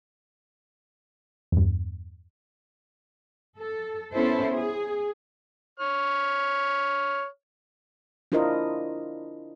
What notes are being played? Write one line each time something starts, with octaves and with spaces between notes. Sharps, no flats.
E2 G2
A4
B3 C#4 E4 A4 C5
G#4
C#5 F6
D4 E4 F4 A#4 C5 D#5